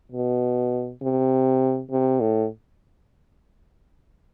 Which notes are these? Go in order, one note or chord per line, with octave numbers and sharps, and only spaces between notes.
B2
C3
C3
A2